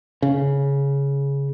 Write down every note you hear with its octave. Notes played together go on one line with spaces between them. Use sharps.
C#3